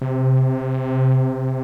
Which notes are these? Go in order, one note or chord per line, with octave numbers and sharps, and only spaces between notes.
C3